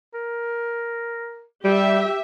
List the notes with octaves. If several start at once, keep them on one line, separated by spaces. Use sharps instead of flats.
A#4
G3 G4 E5